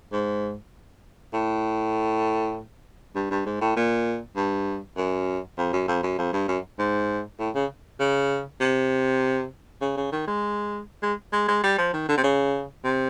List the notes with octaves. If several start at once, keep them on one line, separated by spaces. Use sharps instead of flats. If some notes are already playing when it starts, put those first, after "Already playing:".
G#2
A2
G2
G2
G#2
A2
A#2
G2
F#2
F2
F#2
F2
F#2
F2
G2
F#2
G#2
A2
C#3
C#3
C3
C#3
C#3
D#3
G#3
G#3
G#3
G#3
G3
F3
D#3
D3
C3
C#3
C3